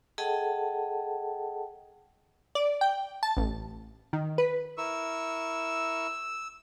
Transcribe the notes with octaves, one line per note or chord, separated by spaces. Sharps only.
G#4 A4 D#5 F#5 G5 A5
D5
G5
A5
A1
D#3
B4
E4 A#4 C#6 E6